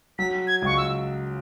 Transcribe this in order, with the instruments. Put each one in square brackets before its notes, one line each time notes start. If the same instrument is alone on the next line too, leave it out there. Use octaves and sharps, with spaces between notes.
[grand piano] F#3 [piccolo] B6
[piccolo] G#6
[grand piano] C#2 [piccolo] C#6
[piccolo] E6